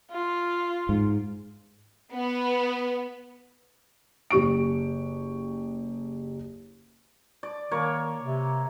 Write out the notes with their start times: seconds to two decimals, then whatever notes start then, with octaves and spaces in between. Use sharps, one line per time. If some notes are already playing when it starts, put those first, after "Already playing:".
0.12 F4
0.89 G#2
2.13 B3
4.30 F#1 G4 C#6 D7
7.43 D5
7.71 D#3 A#3 C#5
8.22 C3